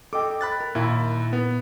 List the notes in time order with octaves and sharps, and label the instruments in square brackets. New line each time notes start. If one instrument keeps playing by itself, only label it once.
[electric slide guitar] A4 D#5 G5 [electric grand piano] D6
[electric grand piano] B5 F#6 A6
[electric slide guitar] A#4
[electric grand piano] D#2 E4 [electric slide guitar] A#2
[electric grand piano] B3